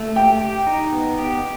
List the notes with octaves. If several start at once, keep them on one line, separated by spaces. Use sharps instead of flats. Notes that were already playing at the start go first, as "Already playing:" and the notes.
Already playing: A3
G4 G5
G4
D#4
B3
G4